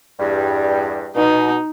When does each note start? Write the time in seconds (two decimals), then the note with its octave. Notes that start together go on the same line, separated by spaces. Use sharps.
0.19 E2 G2 G3
1.16 B2 D#4